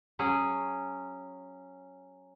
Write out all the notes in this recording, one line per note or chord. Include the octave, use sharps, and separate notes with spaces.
F#3 C#4 G#4